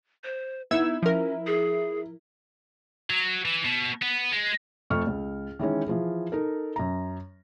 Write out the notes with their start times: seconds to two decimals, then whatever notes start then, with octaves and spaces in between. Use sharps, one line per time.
0.24 C5
0.71 B3 D#4 E4 E6 G#6
1.02 F3 C#4 A#4
1.47 G#4
3.10 F#3
3.45 E3
3.65 B2
4.02 B3
4.32 G#3
4.90 F2 A3 A4 C#6 F6
5.07 C#2
5.59 D#3 E3 G#3 C#4
5.88 E3 F3 G#4
6.32 D#4 A4 A#4
6.76 F#2 A#5